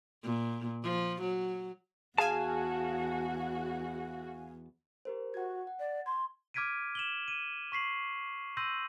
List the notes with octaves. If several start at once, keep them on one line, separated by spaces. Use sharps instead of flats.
A#2
F3
F#3
E2 F#4 G#4 F5 G#5 A5
G4 A#4 C5
F#4 F#5 G#6
F#5
D5
C6 G#6
D6 F6 G#6 B6 D7 D#7
E7 F#7 G7
D#7
C#6 B6 C7 F#7
C6 E6 G6 A#6 D#7 F#7